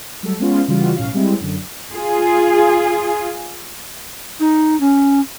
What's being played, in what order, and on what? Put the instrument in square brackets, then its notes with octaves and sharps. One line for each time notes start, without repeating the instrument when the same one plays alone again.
[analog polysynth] F#3 G3 A3 A4
G#3 B3 C#4 F4
C#3 E3 G3 F4 F#4
B1 A2 C#4 F5
G3 G#3 C4 E4
F#2 D3
[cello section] F4 G#4
[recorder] D#4
C#4